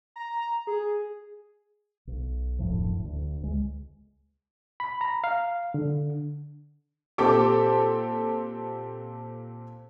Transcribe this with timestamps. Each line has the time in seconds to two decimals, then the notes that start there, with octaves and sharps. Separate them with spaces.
0.16 A#5
0.67 G#4
2.07 B1
2.59 D1 F#2 A2 F3
3.04 D2
3.43 C#2 G#3
4.80 B5
5.01 A#5
5.24 F5
5.74 D3
7.18 A#2 C4 G4 A4 D6